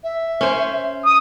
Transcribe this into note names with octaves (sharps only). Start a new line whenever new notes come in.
E5
C#4 C5
D#6